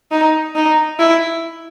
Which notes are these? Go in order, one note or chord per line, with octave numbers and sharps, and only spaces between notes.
D#4
D#4
E4